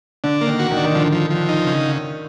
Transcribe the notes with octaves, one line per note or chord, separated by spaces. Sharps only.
D3 D4
A#3
D#3
F#4
D#3
D4
D#3
D3 F3
F3
F3
D#4
C#3